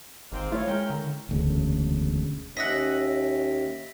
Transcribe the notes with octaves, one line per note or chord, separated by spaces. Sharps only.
G#1 G#2 A#3 C4
A3 E4 F4 C#5
G#3 C#4 A#4 G5
D3
E1 D2 C#3
D#2 C#4 D#5 E5 F#5 A#6 B6